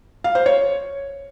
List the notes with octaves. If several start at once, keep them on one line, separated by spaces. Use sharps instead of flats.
F5
C5
C#5